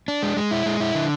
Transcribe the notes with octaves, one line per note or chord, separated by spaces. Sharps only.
D4
G#3
G#3
E4
G#3
E4
D3